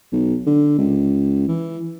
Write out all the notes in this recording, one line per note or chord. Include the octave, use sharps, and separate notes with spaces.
B1
D3
C#2
E3